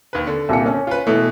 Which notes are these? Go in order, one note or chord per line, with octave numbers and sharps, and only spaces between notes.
D#2 B4
D3
C2 A#2 C#7
C#4
F4 B4
B2 E3 A3